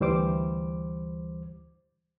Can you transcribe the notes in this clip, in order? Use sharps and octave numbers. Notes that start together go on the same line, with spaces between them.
D2 E3 G3 C5 D6